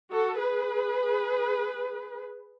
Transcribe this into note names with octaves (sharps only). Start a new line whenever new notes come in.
F#4 A4
G#4 B4